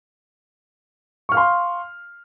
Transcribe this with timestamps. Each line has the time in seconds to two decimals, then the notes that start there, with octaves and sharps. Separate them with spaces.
1.29 C#6
1.32 F6
1.34 F5
1.37 C6